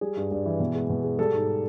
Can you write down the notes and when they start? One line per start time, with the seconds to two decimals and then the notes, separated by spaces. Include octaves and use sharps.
0.01 G3 G#4
0.17 G2
0.31 G2
0.46 E3
0.60 B2
0.75 G#3
0.90 B2
1.04 G#3
1.19 G3 A4
1.33 G#2